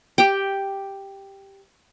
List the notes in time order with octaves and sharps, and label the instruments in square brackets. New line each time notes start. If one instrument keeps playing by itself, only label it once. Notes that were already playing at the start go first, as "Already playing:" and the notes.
[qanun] G4 G5